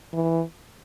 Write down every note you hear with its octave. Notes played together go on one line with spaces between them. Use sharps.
E3